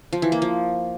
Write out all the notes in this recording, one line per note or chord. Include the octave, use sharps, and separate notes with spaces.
F3
E3
A#3
F3